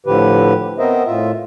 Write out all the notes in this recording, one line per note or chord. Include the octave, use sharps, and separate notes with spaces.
A2 D3 F3 G4 B4
B3 C4 A#4 C5 D#5 E5
A2 F4 E5